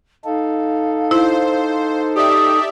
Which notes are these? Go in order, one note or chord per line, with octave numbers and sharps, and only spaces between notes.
D#4 A4 F5
E4 C5
G4 D5 E5 D#6